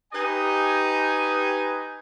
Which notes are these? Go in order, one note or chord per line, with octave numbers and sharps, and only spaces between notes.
D#4 G4 B4 D#5 G#5